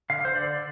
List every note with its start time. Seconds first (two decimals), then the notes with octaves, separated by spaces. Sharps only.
0.10 D3 F5
0.25 C5
0.35 D3 D5